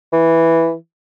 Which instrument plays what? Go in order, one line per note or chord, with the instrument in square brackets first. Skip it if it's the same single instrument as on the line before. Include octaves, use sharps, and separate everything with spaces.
[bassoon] E3